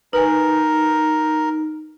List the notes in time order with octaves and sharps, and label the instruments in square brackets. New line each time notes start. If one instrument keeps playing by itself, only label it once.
[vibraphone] D#4 [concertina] A#4 [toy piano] B4 G#5